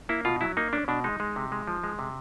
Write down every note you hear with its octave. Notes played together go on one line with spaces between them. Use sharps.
A#3 E4
B2 F4
F#3 E4
A#3 D#4
C#4 D4
B2 D4
G#3 D#4
G#3
C3
G#3
F3
G#3
C3